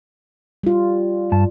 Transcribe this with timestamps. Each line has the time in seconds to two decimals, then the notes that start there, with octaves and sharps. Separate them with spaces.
0.63 G3 F4
1.32 G2 A5